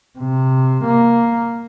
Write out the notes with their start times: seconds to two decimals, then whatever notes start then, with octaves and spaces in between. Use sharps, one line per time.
0.19 C3
0.85 A#3